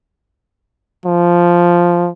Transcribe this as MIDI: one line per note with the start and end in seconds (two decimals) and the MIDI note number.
1.05 2.10 53